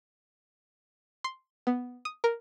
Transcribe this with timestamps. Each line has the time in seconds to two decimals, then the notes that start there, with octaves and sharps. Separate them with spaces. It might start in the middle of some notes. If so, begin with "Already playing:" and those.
1.24 C6
1.67 B3
2.05 D#6
2.24 A#4